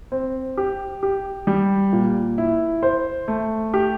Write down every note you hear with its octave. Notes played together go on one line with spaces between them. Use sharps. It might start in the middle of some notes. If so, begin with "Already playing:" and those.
C4
G4
G4
G3
A#2
E4
C5
A3
G4